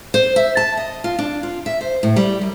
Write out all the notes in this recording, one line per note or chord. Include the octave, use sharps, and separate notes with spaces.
C5
E5
A5
D#5
F4
D4
F4
E5
C5
A2
G3
F#2